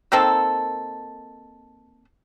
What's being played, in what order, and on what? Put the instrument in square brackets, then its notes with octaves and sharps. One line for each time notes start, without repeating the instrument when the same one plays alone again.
[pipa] D#3 A#3 C4 A4